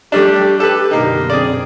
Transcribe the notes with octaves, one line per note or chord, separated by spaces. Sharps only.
G3 A3 D4 G4
A4 B4
F#2 B2 D3 A#3 D#4
C4 G#4 D5